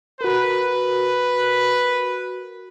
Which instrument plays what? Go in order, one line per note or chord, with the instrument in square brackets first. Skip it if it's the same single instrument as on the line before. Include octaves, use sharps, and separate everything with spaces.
[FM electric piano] F#4 A#4 [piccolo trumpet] B4